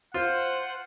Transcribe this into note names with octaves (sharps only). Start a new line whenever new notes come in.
F4 C5 F#5